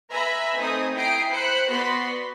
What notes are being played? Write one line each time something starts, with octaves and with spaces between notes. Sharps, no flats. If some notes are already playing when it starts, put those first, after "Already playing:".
B4 E5 G#5 A#5 B5 A#6
A3 C4 D#4 G#5 D#6
E4 G5 A#5 D#6 C7 D7
C5 B5 F#6 C#7
B3 F#4 D5 B5 C6 B6